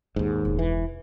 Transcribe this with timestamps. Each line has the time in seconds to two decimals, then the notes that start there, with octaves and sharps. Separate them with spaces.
0.16 A#1 D#2 G#2
0.42 E1 C#2
0.59 E3